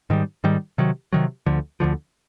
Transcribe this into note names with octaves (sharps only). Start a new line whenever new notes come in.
G#2 D#3 G3
G#2 D#3 G3
C3 D#3 F#3
C3 D#3 F#3
D2 D3 F3
D2 D3 F3